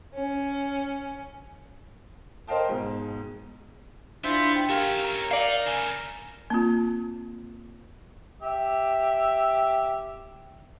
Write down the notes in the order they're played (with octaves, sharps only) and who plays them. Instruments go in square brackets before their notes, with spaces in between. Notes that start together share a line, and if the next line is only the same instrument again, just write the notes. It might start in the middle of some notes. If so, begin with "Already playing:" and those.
[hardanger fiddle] C#4
[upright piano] A#4 C5 D#5 F5 G5 A5
G#2 B2
[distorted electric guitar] B3 [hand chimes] D4 E4 [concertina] F4 C5 E5
[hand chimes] G5
[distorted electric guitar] A3 C#4 [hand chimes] G4 F5 [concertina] A#4
[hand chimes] A#5
[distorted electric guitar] D#4 [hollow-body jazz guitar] D5 F5
[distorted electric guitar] C#3 A3 [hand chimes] G#5
[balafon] A#3 C4 F4
[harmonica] G4 E5